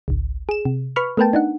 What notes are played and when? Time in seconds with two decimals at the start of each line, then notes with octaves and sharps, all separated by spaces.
0.08 G#1 C#2
0.49 G#4 E7
0.65 C3
0.96 B4 B5 C#6 F6
1.17 A3 B3 A#4 B4 G5 A5
1.33 D4 D#4 F#5